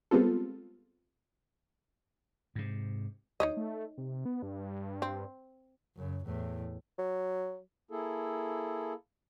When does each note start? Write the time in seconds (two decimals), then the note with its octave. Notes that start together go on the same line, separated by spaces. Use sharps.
0.11 G3 G#3 B3 C4 F4 A4
2.55 G#2 C3
3.40 D2 D#4 C#5 D#5
3.57 A3
3.98 C3
4.25 B3
4.42 G2
5.02 C4
5.96 F#2 C#3
6.25 E2 A2
6.98 F#3
7.91 A#3 E4 G#4 A4